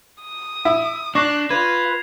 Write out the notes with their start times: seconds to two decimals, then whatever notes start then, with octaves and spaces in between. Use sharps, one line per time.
0.21 D#6
0.65 E4
1.15 D4 C#6 D6 F#6 A#6 C7 E7
1.50 F4 B4 G#6 F7